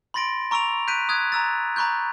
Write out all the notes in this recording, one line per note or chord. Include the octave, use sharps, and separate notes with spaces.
B5 C6 A6 A#6 D7
A#5 C#6 E6 D7 F7
F#6 G6 B6 D7 D#7
D#6 F#6 G#6
A#5 E6 A6
A#5 B5 C#6 F#6 G6